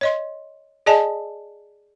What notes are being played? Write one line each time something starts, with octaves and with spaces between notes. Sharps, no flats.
C#5 D#5 C6
G#4 D5 D#5 G#5 A5